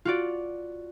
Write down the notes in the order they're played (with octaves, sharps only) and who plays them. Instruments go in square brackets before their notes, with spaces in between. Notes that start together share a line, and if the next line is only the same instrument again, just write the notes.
[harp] F4 F#4 D5